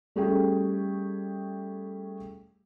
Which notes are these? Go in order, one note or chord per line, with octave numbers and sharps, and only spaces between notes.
G3 A3 C#4 G4 G#4 G5